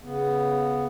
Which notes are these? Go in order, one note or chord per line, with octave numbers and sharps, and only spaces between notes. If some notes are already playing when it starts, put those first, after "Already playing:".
C#3 B3